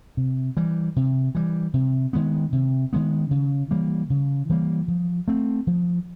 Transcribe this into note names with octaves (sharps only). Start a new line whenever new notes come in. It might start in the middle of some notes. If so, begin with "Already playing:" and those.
C3
E3 G3
C3
E3 G3
C3
D#3 G#3 B3
C3
D#3 G#3 B3
C#3
E3 G3 A#3
C#3
E3 G3 A#3
F3
A3 C4
F3